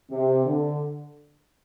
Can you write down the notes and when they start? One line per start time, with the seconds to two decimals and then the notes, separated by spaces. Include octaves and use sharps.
0.11 C3
0.46 D3